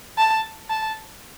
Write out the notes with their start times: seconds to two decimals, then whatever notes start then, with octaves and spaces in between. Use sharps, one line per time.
0.18 A5
0.70 A5